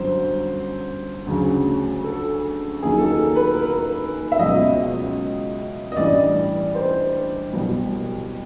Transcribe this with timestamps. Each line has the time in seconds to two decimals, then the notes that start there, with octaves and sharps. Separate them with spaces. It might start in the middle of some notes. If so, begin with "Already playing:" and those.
Already playing: G1 F#2 D3 F#3 C5
1.26 D2 C#3 F#3
2.04 A4
2.82 D#2 D#3 F#3 G#4
2.98 A4
3.10 A#4
3.36 B4
3.51 A#4
3.61 B4
4.32 E5
4.39 C#2 B2 F#3 D#5
5.92 D#5
5.96 A1 G2 E3 D5
6.75 C5
7.53 C2 B2 F#3